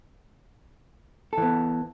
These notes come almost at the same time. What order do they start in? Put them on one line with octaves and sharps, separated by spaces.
A4 E3 B3